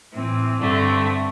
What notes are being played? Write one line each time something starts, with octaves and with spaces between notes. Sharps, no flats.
A2 E3 C4
G2 D3 A3 C4